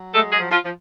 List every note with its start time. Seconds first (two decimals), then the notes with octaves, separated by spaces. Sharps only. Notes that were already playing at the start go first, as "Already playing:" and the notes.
Already playing: F#3
0.13 G#3 A3 A4
0.32 G#3 G#4
0.39 F3
0.51 F3 F4
0.64 F3